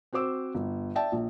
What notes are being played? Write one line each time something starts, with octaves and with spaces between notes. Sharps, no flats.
C4 F#4 C5 D6 E6
G1
D5 E5 G5 A5
A#1